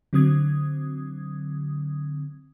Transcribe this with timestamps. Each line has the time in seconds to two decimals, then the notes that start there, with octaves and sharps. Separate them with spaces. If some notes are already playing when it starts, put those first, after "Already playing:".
0.13 D3 F#3 C4 D#6 G#6